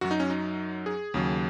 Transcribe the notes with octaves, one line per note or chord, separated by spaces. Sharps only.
F#2 F#3 F#4
D#4
C#4
D#4
G#4
D#2 C#3 F#3